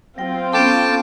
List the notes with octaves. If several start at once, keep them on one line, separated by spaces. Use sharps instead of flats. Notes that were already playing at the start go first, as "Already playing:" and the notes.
F#3 C4 F4 G5
B3 C#4 A4 G5 A5 D6